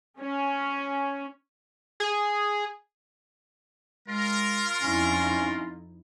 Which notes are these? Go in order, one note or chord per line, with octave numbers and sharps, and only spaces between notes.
C#4
G#4
G#3 F4 A#4
F2 C#4 D#4 E4